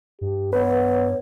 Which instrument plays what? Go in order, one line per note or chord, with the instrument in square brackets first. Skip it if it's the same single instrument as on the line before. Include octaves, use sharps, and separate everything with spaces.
[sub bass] G2 [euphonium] G4
[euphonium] B3 [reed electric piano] B4 [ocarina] C#5